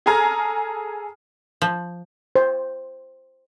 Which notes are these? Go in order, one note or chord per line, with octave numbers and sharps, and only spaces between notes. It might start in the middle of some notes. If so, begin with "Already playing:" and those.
G#4 A4 G#5 A#5 F6 G#6
F3
C5